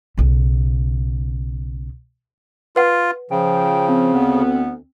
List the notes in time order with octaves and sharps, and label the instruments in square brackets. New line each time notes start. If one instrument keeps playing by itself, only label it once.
[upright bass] B1 C#3
[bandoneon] F4 [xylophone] B4 F#5
[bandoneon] C#3 [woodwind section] F3 [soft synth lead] G5
[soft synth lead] C4
[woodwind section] D2 B3